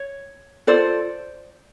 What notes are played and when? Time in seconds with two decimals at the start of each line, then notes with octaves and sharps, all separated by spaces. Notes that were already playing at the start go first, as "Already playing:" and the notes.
Already playing: C#5
0.67 F4 A4 C5 D5